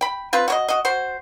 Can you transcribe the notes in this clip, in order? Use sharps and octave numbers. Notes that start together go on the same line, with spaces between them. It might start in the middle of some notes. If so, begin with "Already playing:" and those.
G5 B5
C4 F4 B4
F#4 C#5 D#5
F#4 D#5
F#4 C5